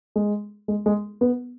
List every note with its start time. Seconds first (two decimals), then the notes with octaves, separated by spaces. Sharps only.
0.16 G#3
0.68 G#3
0.86 G#3
1.21 B3